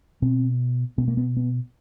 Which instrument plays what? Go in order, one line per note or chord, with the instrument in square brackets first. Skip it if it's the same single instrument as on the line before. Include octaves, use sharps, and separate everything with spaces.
[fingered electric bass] B2 C4
B2 B3
A#3
B3
B3